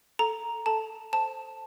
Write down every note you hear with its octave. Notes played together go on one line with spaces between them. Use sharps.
A4 A#5
A4 A5
C5 A5